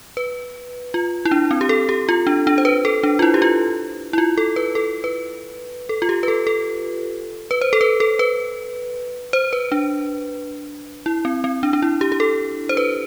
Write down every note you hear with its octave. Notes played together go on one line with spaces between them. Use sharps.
B4
F4
E4
D4
C4
G4
A4
G4
F4
D4
D4
C5
B4
A4
D4
F4
E4
G4
F4
E4
F4
A4
B4
A4
B4
A4
F4
G4
B4
A4
A4
B4
C5
A4
B4
A4
B4
C5
B4
D4
E4
C4
C4
D4
D4
E4
G4
G4
A4
C5
B4